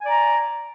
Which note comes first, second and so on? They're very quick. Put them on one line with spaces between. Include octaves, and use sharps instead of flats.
G#5 D5 A#5